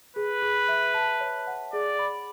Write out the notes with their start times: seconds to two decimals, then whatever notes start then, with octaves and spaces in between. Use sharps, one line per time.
0.16 G#4 B4
0.42 G#4
0.68 E5
0.94 A5
1.21 C#5
1.47 F#5
1.73 G#4 D5
1.99 B5